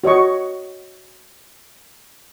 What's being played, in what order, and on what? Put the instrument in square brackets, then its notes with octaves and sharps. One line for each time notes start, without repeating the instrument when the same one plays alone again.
[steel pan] F#4 C#5 D#5 C#6